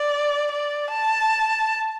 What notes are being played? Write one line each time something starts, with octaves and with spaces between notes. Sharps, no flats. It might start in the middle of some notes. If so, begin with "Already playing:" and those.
Already playing: D5
D5
A5